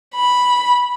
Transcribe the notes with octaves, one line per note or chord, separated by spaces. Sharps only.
B5